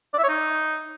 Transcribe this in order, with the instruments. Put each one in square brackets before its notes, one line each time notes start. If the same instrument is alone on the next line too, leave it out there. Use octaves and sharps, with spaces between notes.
[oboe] D5
E5
C#5
D#4